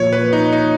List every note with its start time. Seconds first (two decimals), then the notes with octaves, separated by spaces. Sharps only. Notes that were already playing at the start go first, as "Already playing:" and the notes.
Already playing: A#2 F3 A#3 F4 C#5
0.13 B4
0.33 D#4
0.53 D#4